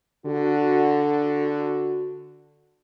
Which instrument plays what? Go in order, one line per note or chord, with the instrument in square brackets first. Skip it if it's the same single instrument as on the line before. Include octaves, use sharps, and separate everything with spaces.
[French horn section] D3 F#4